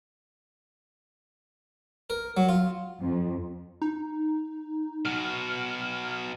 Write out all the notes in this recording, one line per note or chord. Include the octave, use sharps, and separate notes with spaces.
A#4
F#3
F4
F2
D#4
B2 F#3 F6